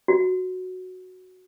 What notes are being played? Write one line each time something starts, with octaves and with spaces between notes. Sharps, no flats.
F#4